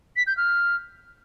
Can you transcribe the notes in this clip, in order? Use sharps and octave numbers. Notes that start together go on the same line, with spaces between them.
B6
G6
F6